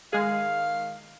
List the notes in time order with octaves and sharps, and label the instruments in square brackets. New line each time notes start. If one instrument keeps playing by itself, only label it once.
[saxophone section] D#3 F5 [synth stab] G#3 G#4